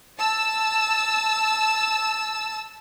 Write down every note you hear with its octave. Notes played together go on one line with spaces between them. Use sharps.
A5 E6